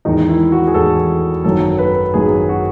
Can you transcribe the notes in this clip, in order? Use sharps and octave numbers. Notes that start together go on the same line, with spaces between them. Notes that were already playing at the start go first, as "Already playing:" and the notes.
E2 D#3 G#3 D#4
E4
F#4
G#4
E2 D#3 G#3 A4
G#1 F#2 D#3 F#3 A4
B4
G#1 F#2 D#3 F#3 G#4
F#4